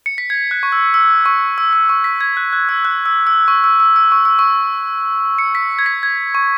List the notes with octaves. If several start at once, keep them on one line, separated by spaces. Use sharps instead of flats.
C#7
B6
G#6
F#6
C#6
E6
E6
C#6
E6
E6
C#6
B6
G#6
F#6
F#6
E6
F#6
E6
E6
C#6
E6
E6
E6
C#6
E6
C#6
C#7
B6
G#6
B6
G#6
C#6